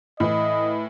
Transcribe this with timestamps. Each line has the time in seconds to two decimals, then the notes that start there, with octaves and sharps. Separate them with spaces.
0.20 A2 E3 D#5